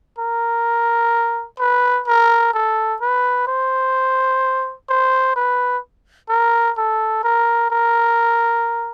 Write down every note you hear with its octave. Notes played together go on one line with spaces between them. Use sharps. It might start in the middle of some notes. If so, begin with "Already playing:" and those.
A#4
B4
A#4
A4
B4
C5
C5
B4
A#4
A4
A#4
A#4